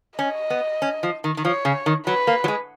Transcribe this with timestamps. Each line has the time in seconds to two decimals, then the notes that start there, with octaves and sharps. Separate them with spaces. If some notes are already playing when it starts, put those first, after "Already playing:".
0.19 C#4 D#5
0.50 B3
0.82 C#4
1.03 F3
1.24 D#3
1.37 D#3
1.45 F3 C#5
1.65 C#3
1.86 D#3
2.07 F#3 B4
2.27 A#3
2.44 F#3
2.48 G#3